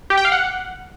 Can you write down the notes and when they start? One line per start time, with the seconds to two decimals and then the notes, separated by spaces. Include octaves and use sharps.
0.10 G4
0.17 G5
0.25 F5
0.32 F#5